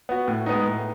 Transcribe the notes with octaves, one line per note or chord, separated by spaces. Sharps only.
B3 F#4
A2
G#3 B3 D#4
A2